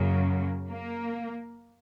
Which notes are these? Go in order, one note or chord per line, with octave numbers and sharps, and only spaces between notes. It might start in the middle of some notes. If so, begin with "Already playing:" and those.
Already playing: F#2 C#3 F#3 A#3
A#3